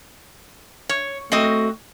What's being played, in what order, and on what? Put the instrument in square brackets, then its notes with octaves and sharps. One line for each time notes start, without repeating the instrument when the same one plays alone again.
[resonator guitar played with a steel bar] C#5
[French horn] A3 [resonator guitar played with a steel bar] C4 F#4 D#5